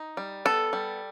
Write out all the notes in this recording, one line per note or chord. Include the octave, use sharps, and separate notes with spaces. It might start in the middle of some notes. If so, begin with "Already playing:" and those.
Already playing: D#4
G3
B3 A4
G3